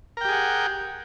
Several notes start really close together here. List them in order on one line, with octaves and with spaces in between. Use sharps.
A#4 G5 G4 G#4 F#5